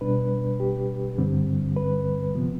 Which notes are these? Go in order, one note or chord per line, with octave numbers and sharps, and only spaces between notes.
B2 G3 D4 B4
G4
G2 D3 G3 C4
B4
C3 F3 B3